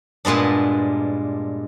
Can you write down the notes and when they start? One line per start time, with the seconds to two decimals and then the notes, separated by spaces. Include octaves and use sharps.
0.25 G2 A#2 G#3 B3 D4